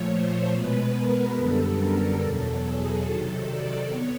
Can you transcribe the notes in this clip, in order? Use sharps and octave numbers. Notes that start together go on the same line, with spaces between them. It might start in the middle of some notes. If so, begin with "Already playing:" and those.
Already playing: A#2 F3 A3 C#5
C5
B2 G#3 B3 B4
A#4
F#2 D3 G3 B3 A4
A#4
E2 B2 F#3 A4
G#4
C3 D#3 F#3 A4
D5
B3 C#5